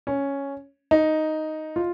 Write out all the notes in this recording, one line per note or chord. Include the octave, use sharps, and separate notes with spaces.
C#4
D#4
F4